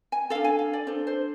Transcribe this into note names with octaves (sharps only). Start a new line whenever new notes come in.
G#5
D4 A4 F5
G#5
F5
D5
D4 A4 C5
C5